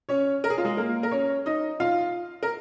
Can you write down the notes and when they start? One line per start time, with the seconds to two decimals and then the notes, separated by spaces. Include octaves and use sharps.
0.09 C#4 C#5
0.44 A#4
0.50 G#4
0.58 F4
0.65 G#3 G#4
0.77 A#3 A#4
1.03 A#4
1.11 C#4 C#5
1.46 D#4 D#5
1.80 F4 F5
2.43 A#4